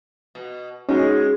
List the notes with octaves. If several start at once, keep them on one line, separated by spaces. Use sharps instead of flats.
B2
G#3 C#4 D#4 F#4